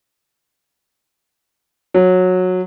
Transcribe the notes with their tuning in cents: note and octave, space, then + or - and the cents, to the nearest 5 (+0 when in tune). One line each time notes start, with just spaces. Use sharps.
F#3 -15